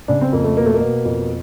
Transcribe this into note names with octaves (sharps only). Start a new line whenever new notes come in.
C#3 D4
C4
F2 A#3
A3
B2 A#3
A3
A#3
B2
F2